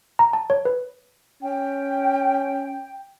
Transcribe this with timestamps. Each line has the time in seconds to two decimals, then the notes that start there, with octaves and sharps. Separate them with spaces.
0.19 A#5
0.33 A5
0.50 C#5
0.65 B4
1.43 C#4 G5